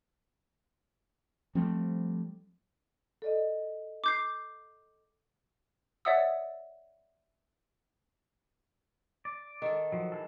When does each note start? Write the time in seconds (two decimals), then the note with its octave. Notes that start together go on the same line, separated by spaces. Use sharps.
1.55 F3 G3 A3 C4
3.22 A4 D5 D#5
4.04 D6 G6 C7
6.05 C#5 D5 E5 F#5 D#6 E6
9.25 D5
9.62 D#3 A4
9.92 F3 F#3
10.12 E3 G#3 A4